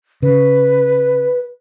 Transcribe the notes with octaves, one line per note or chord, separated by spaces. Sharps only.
C#3 B4